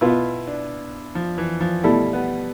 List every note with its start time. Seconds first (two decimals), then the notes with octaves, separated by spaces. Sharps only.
0.01 B2 B3 E4 F4
0.47 D4
1.15 F3
1.38 E3
1.61 F3
1.83 B2 G3 A3 E4 A4
2.13 B3